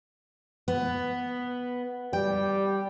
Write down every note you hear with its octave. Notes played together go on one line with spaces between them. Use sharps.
B3
G3 G5